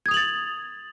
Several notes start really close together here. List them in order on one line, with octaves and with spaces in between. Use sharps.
G#6 D#6 F7 F#7 A6